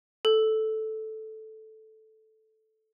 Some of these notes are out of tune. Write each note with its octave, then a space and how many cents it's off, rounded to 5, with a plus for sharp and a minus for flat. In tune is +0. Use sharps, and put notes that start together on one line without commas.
A4 -5